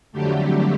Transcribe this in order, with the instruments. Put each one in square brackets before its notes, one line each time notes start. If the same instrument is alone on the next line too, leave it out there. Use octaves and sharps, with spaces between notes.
[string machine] F2 D3 F#3 G3 A3 G4